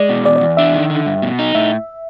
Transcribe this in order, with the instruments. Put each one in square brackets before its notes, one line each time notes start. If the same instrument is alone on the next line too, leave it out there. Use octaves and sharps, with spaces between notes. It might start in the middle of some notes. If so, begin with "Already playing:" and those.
Already playing: [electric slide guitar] G#3 [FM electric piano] D5
[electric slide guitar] B2
[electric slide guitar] E2 [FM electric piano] D5
[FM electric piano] D5
[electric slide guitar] E2
[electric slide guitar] D4 [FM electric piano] E5
[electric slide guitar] D#3
D3
G2
B2
D#4
[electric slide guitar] A2 [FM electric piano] E5